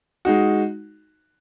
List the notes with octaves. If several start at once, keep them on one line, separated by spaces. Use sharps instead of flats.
G#3 D#4 F#4